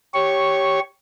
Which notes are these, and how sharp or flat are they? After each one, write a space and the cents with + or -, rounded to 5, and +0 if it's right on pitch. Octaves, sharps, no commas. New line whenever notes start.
G4 -5 C#5 +0 C#6 -5